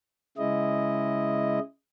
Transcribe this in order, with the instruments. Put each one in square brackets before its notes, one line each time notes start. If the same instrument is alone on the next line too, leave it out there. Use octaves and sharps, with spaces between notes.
[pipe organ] C#3 G#3 E4 D#5